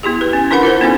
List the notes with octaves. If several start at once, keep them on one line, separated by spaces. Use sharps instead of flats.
B3 E4 G4 G#4
B4
C#4
D4 E4 A#4 B4 F#5 B5
F4 A#4 C5
B3 C#4 D#4 A4